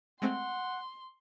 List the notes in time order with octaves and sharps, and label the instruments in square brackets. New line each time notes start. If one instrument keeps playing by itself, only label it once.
[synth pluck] G#3 A3 C4 [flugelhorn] F#5 [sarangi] C6